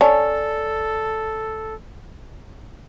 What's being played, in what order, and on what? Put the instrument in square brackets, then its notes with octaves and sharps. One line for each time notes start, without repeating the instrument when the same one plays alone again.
[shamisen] C#4 [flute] A4 [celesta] D5 A5